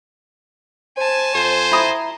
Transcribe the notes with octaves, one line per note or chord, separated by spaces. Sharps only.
C5 G#5 A5
F2 C5
E4 A#5 D#6